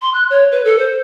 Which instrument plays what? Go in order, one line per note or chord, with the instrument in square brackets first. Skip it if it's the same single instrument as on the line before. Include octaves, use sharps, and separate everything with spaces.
[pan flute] C6
F#6
C#5
B4
A4
C5